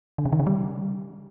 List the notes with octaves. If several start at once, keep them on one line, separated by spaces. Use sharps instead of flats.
D3
C#3
D#3
C#3
G3